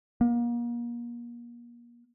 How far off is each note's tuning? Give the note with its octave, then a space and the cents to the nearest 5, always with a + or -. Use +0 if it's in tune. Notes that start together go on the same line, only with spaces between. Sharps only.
A#3 +35